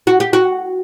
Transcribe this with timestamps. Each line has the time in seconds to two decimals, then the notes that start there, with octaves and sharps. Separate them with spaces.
0.07 F#4
0.20 G4
0.33 F#4